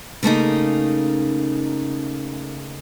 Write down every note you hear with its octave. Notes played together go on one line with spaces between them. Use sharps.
C#3 A3 A#3 D#4